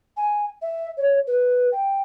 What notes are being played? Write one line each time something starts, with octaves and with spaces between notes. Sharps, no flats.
G#5
E5
C#5
B4
G5